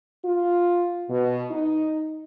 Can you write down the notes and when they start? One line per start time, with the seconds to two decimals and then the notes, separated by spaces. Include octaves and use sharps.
0.25 F4
1.10 B2
1.51 D#4